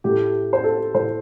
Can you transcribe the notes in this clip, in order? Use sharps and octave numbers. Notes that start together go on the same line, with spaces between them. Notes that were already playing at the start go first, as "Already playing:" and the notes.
A2 A3 G4
C5
A4
A2 A3 C5